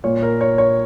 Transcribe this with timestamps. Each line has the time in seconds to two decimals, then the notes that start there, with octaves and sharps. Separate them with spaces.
0.04 A#2 A#3 F4 C#5
0.22 A#4
0.41 C#5
0.58 C#5